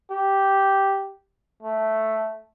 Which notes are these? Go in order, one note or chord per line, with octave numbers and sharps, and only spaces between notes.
G4
A3